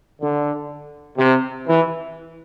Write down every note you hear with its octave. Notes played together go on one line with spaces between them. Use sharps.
D3
C3
E3